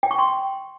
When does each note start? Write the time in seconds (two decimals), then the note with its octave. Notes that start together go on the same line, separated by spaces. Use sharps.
0.03 G5
0.11 C#6
0.19 C6